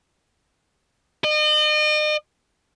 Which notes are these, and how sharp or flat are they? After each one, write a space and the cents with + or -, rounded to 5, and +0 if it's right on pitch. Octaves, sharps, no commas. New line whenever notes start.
D#5 -40